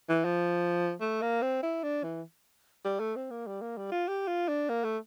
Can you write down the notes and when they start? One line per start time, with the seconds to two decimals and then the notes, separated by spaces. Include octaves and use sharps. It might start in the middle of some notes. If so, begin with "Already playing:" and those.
0.09 E3
0.25 F3
1.01 A3
1.22 A#3
1.42 C4
1.63 E4
1.83 D4
2.04 E3
2.85 G3
3.00 A3
3.16 C4
3.31 A#3
3.47 G3
3.62 A#3
3.77 G3
3.92 F4
4.08 G4
4.28 F4
4.48 D4
4.69 A#3
4.84 A3